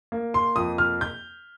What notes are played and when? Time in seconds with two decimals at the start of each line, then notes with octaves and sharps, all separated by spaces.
0.12 A#3
0.34 C6
0.56 F2 D#6
0.78 F6
1.01 G6